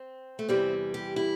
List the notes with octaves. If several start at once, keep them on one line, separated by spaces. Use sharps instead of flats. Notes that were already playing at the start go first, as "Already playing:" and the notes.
Already playing: C4
A3
E2 C3 E3 G3 C4
G4
E4